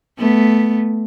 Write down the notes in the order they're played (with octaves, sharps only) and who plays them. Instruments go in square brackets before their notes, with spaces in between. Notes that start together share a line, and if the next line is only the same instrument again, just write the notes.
[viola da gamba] A3 B3